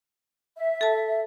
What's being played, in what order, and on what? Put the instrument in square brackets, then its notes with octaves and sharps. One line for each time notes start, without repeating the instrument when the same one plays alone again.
[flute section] E5
[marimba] A4 A5